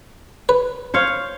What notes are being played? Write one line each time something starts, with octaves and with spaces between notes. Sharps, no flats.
B4
C5 C#5 F5